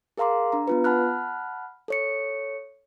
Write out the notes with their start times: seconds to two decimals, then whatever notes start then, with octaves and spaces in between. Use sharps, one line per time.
0.18 G#4 A#4 F5 A#5 C6 D6
0.52 D4 A#5
0.67 B3 F4 B4
0.84 F#5 A5 B5 F6 F#6
1.88 A4 C#5 C#7